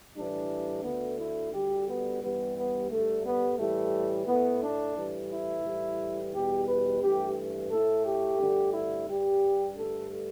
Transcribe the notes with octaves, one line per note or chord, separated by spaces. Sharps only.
A2 E3 G3 D4
D2 D3 A3 B3
E4
D2 D3 G3 G4
B3
G2 E3 G3 B3
B3
G2 D3 G3 A3
B3
A2 E3 G3 A3
A2 A3 B3
D4
A2 E3 G3
E4
A2 E3 G3
E2 B2 G3 G4
B4
G2 E3 A3 G4
A2 A3 A4
G4
G2 D3 A3
E4
G2 G3 G4
G2 D3 A3 A4